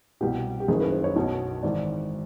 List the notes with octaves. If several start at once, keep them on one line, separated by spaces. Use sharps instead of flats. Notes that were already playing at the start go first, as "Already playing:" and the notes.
C2 B2 G4
G4
F#1 F#2 D#3 G#4
B4
C5
C#5
B1 B2
G#1 G#2 E3 D5